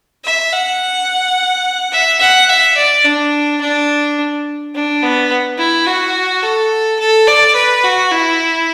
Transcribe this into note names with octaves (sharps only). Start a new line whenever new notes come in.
E5
F#5
E5
F#5
E5
D5
D4
D4
D4
B3
E4
F#4
A4
A4
D5
B4
F#4
E4